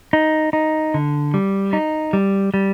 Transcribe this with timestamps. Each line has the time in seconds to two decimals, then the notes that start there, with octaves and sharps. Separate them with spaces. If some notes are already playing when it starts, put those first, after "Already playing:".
0.13 D#4
0.53 D#4
0.94 D3
1.34 G3
1.73 D#4
2.13 G3
2.54 G3